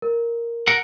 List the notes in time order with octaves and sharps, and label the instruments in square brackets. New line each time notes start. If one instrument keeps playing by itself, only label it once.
[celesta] A#4
[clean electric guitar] A#4 F#5